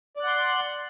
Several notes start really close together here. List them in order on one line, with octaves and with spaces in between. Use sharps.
D5 F#6 F#5 C6